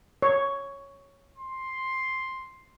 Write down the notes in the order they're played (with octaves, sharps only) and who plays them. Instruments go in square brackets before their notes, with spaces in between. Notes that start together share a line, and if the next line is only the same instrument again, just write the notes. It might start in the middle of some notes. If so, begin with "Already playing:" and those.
[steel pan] C#5
[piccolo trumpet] C6